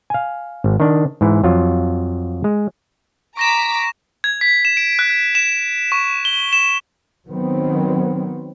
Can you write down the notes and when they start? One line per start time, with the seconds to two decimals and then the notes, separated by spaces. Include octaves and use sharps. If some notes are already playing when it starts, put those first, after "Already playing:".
0.10 F5 G#5
0.64 G#1
0.80 D#3 D4
1.21 G#2 E3
1.44 F2 F#3 F4
2.44 G#3
3.37 A#5 C#6 D6 A#6 B6 E7
4.24 G#6
4.41 B6
4.65 E7
4.77 D7
4.99 F#6
5.35 E7
5.92 C#6
6.25 G7
6.53 E7
7.28 D#3 F#3 B3 C4